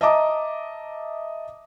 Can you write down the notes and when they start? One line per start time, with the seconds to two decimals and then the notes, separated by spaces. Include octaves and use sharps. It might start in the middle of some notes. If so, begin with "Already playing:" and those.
0.01 D#5 E5 A5 A#5 D6 D#6